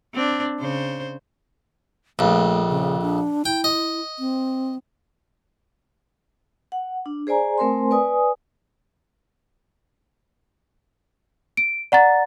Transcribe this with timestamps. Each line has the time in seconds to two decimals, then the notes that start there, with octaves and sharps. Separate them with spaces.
0.14 C4 D4
0.60 C#3 C5
2.19 A#1 F2 A3
2.68 C#3
3.02 D4
3.45 E4 G5
3.64 D#5
4.19 C4
6.72 F#5
7.06 D4
7.27 G#4 C5 D5 G#5 A#5
7.58 A3 C4 A#4 C5 G#5 C6
7.91 B4 D5 G#5 D#6
11.57 D7
11.92 D5 F#5 A#5 A6